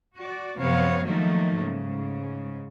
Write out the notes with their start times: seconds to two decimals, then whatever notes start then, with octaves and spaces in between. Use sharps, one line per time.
0.18 F#4 D5
0.58 F#2 C3 F3 B3 C#5 F5
1.05 D#3 F3 F#3 A3 A#3 D#4
1.61 G#2 C#3